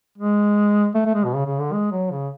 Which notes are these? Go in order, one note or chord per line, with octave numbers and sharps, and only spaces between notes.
G#3
A3
A3
G#3
B2
C#3
C#3
D3
G#3
F#3
C#3